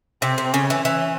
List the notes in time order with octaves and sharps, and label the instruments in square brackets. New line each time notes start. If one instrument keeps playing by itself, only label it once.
[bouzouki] C3 [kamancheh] C4
[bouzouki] C3
[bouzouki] C#3 [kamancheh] C#4
[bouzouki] E3
[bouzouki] E3 [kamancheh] C#4